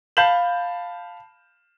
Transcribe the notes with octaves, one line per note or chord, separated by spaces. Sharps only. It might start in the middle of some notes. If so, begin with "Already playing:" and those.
F5 A5 B5 G6 E7 F#7